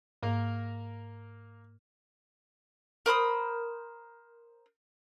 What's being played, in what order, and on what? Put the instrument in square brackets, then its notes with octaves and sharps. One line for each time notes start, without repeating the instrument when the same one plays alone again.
[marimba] G#2 [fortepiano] A#3 A#4
[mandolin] A#4 C5 B5 D#6